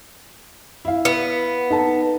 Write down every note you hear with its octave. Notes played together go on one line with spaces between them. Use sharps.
E4 F5
B3
D#4 A4 A5